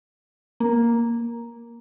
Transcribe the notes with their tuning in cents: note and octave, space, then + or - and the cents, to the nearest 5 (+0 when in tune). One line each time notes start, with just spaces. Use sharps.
A#3 +5